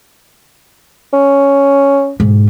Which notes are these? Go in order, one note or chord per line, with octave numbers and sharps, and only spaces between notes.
C#4
G#2 B2